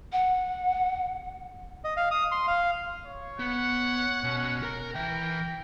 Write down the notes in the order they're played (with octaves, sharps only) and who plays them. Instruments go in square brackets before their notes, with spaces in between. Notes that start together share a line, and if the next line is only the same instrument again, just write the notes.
[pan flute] F#5
[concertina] D#5
F5
D#6
C6
F5
[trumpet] C#5
[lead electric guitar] B3 [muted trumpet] F#5
[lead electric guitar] B2 [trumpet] C#4
[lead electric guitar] A#4 A#5
[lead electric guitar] E3 E5 [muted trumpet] A#4 [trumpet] G5